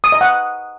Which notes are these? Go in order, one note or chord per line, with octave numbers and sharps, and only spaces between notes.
D#6
D#5
F#5